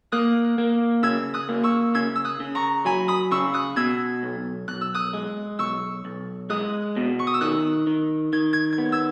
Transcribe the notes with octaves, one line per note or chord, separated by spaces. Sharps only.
A#3 D#6 F#6
A#3
C#3 E6 G#6
D#6 F#6
A#3
C#6 E6
C#3 E6 G#6
E6
D#6 F#6
C#3
A#5 C#6
F#3 G#5 B5
B5 D#6
C#3 C#6 E6
D#6 F#6
B2 E6 G#6
B1
B1 F#6
E6
D#6 F#6
G#3
B1 C#6 E6
B1
G#3 D#6 F#6
B2
C#6
D#6
E6
D#3 D#6 F#6
D#3
D#3 G#6
G#6
G#6
B3
E6 G#6